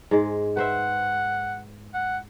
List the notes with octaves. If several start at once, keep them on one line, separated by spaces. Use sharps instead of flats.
G#2 G#3
B4 C5 E5 F#5
F#5